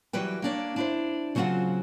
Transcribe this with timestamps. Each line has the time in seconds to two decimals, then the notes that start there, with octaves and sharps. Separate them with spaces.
0.13 E3 F#3 G3 B4 G5
0.42 A#3 D4 C#5
0.76 D4 E4 C5
1.35 C#3 F#3 C4 E4 F4 F#5